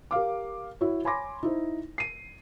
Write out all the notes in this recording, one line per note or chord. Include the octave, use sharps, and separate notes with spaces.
G4 A#4 F5 D6
E4 F#4 C#5
C#5 G#5 B5 C6 D6 A#6
D#4 E4 C5
C7 D#7